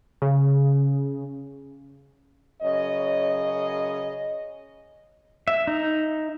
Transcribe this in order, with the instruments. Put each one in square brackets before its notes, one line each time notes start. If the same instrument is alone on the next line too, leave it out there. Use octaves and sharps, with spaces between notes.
[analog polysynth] C#3
[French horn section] F#2 C#3 C#5 D#5
[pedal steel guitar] E5
D#4